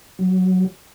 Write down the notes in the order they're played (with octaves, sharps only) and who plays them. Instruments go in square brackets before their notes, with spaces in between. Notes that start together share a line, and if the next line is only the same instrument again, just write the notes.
[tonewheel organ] F#3